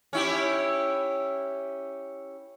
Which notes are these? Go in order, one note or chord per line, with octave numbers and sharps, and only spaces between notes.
C#4 E4 G4